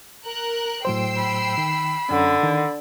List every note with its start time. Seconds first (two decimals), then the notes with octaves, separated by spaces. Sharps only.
0.22 A#4 F#6
0.85 A2 F#3 C5 G5 E6 C7
1.17 B5
1.58 D#3
2.11 F#2 D3 C#4
2.43 D#3